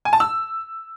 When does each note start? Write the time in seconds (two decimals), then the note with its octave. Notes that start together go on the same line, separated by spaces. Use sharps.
0.05 G#5
0.13 A5
0.20 E6